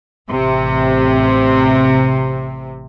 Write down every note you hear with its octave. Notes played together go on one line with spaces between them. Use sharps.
A1 C3